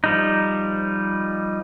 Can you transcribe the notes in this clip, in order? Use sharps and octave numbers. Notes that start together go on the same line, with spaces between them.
F3 G3 D#4